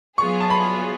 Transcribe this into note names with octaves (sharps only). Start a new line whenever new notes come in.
F#3 B3 F4 G#4 C#6
A5
B5